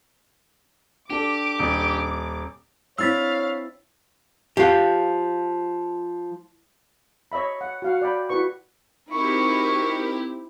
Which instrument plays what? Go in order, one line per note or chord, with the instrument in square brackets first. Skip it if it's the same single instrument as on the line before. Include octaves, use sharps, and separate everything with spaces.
[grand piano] D4 A4 [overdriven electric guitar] G4 [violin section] D6
[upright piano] D#1
[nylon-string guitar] C4 D4 E4 [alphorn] C#5 [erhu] F5 [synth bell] E6 A6 B6
[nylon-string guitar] F3 [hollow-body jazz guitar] G4 F5
[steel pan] C#5 D#5 E5 B5
F#5
F#4 F5 F#5
D5 G5 B5
E4 F#4 B4 C#6
[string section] C4 E4 G4 [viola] D#4 [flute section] F#4 A#4 D#5 [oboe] C#6